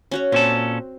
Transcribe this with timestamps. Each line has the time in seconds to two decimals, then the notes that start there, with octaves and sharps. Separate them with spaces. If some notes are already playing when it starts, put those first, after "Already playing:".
0.11 C#4 F#4 C#5
0.32 A#2 C4 C#4 A4